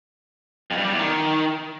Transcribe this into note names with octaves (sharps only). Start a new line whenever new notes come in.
F2
G2
G3
E2
D#3